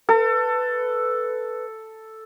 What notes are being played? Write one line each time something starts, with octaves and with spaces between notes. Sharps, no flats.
A4 B4